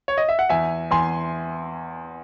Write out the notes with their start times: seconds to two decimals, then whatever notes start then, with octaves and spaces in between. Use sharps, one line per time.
0.08 C#5
0.17 D#5
0.29 E5
0.39 F#5
0.49 E2 E5 G#5
0.91 E2 G#5 C6